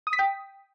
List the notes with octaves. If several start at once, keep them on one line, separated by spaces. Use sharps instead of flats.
D#6
B6
G5